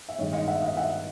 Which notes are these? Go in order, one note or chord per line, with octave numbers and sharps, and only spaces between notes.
E5
G2 D#3 G#3 C#5 D#5
D#5 F5
E5 F#5
D#5 F5
E5 F#5